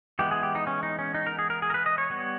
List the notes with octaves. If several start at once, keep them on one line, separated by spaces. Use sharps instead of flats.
E3 G#3 B3 G4
G#4
G4
D#4
C#4
D#4
C#4
D#4
A#4
G#4
A#4
G#4
A#4
B4
D#5
C#5
G3 B3